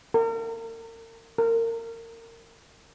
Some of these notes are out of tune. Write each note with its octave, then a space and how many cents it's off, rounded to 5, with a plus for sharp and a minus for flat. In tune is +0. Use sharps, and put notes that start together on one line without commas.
A#4 -40
A#4 -25